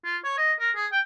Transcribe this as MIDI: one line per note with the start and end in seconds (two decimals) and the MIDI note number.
0.05 0.17 65
0.24 0.34 73
0.38 0.53 75
0.60 0.71 70
0.76 0.86 68
0.92 1.00 79